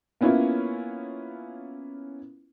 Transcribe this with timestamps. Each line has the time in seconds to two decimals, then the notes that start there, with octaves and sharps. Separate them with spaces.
0.21 A#3 B3 C#4 E4 F4